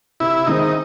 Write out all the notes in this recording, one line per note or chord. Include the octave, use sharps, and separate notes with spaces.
C3 E4
D#3 G#3 C4 D#4